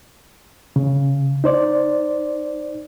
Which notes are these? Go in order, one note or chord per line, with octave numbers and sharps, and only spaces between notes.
C#3
D#4 C5 D5